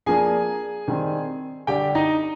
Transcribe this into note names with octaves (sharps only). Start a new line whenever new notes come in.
F3 A#3 D4 G#4 G#5
D#3 G3 C4
D3 G3 D4 G4 G5
D#4 D#5